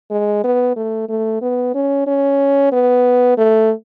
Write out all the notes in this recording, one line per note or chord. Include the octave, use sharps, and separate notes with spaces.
G#3
B3
A3
A3
B3
C#4
C#4
B3
A3